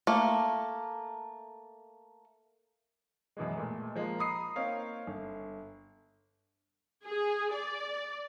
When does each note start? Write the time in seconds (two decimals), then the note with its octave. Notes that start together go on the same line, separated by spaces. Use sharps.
0.07 A3 A#3
3.37 F#2 B2 E3 G#3
3.57 A#2 G#3 A3
3.95 F3 G#3 A#3
4.18 A#5 B5 D#6 C7
4.56 A#3 C4 D#4 C#5 F5
5.07 G1
7.05 G#4
7.53 D5